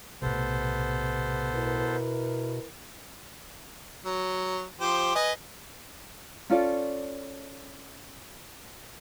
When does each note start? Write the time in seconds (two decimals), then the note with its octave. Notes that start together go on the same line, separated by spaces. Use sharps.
0.22 B1 A2 C3 B3 A4 C5
1.53 B2 E4 A#4 B4
4.06 F#3
4.80 F3 G4 C5
5.15 B4 D#5 G#5
6.50 C#4 F4 A4 D5